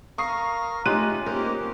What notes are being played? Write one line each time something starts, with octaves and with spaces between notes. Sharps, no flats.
A#4 F5 A#5 C#6 D#6 C7
G#3 A3 C#4 D#4 F4 G4 F#6 D#7
G#3 A#3 C#4 G4 A#4 C5 D#5